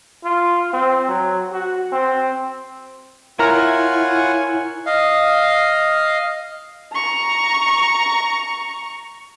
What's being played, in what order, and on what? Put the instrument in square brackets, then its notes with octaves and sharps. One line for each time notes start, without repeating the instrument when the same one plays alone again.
[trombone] F4
C4
F#3
F#4
C4
[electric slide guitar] E4 [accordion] F4 F#5 [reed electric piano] A#4 A#5 F6 [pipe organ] C#5 G#5
[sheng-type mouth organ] D#5 F5
[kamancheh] A#5 C#6